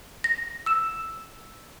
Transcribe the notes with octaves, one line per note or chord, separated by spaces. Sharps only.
A#6
E6 E7